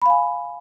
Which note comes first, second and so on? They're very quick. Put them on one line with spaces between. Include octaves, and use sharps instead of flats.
B5 F5 G#5